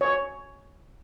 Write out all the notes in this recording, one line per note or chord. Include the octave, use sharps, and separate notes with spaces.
C#5